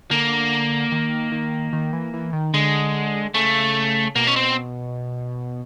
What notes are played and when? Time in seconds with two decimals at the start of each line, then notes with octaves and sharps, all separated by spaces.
0.11 D3 A#3
0.92 D#3
1.32 D#3
1.73 D#3
1.93 E3
2.13 E3
2.33 D#3
2.53 D3 G#3
3.34 C#3 A3
4.15 B2 A#3
4.27 C#4
4.36 C4